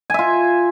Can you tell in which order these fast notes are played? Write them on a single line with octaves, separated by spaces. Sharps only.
G#5 E5 F4